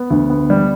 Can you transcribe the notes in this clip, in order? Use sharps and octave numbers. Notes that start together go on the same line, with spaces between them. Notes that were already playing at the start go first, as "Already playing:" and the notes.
Already playing: B3
D2
B3
G3